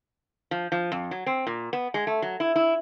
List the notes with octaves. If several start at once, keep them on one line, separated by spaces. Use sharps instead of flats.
F3
F3
F2
F#3
C4
A#2
B3
G#3
A3
F#3
E4
E4